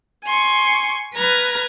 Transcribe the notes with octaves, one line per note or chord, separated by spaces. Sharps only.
G#5 C6 C#6
B4 A#5 F6 G#6